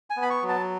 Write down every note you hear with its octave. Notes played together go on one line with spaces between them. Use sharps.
G#5
B3
B5
C#6
F#3
A5